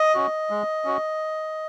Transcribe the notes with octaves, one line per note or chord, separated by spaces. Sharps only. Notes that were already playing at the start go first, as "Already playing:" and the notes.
Already playing: D#5
C#4 F#4
G#3
C#4 F#4